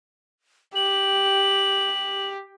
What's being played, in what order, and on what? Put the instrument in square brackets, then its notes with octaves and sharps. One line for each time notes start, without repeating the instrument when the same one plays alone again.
[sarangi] G4 [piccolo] F#7